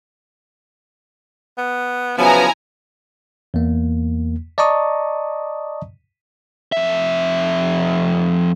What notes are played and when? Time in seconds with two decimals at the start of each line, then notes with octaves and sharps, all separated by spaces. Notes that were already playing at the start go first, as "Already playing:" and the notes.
1.58 B3
2.18 C#3 F3 F#3 B3 E4 G#5 A#5
3.54 E2 A#3
4.58 D5 D#5 A5 A#5 C#6 D#6
6.72 F2 E5